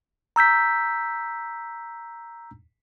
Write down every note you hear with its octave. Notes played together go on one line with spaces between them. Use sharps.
A#5 E6 G6 B6